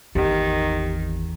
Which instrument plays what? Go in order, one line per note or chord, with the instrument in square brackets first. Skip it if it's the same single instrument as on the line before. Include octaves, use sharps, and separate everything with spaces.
[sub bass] G#1 [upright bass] E2 [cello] D#3 [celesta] G4